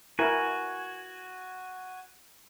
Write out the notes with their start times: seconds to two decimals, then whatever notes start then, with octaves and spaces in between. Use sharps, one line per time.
0.19 E4 F#4 A#4 G#5